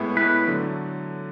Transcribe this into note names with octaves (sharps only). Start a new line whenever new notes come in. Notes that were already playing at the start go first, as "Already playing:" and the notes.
Already playing: A2 G#3 B3 E4
A2 G#3 B3 E4 B4
D3 F#3 A3